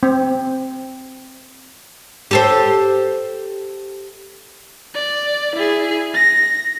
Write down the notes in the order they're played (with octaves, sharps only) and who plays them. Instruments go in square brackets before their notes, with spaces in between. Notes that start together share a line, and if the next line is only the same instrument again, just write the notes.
[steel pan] C4
[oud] G4 A4 C5
[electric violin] D5
E4 G#4
A#6